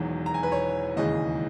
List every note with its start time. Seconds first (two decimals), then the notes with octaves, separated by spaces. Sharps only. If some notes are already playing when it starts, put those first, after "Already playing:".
Already playing: E1 E2 D#3 F#3
0.26 A#5
0.34 G#5
0.43 B4
0.52 C#5
0.96 E1 D#2 C#3 E3 G#3 D#5